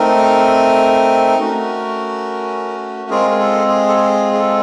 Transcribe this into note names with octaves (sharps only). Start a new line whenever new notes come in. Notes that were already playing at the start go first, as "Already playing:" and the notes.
Already playing: A3 C4 D#4 A#4
A3 C#4 F#4
G#3 C4 F4 G#4 A#4
A#4
A4
G#4
A4
G#4
G#4
A4